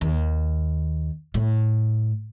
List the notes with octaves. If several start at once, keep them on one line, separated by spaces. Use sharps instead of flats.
D#2
A2